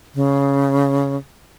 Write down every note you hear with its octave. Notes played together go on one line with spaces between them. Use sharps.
C#3